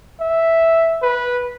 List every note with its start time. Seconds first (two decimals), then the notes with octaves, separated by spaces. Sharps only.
0.21 E5
1.03 B4